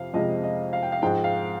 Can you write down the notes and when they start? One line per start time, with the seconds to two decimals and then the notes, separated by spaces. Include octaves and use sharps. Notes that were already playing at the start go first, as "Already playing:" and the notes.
Already playing: F2 C3 F5
0.14 F2 C3 F3 G#3 D#5
0.44 D#5
0.73 F5
0.83 G5
0.92 F5
1.02 G#2 F3 G#3 G5
1.24 F5